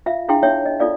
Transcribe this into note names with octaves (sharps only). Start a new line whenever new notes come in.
F4 E5 F5
D4 E4 G#4 F5 G5 C6
D#4 C#5 E5 G5
D#5
D#4 F4 A4 D5 F5